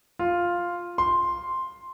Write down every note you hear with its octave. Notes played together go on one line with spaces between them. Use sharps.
F4
C6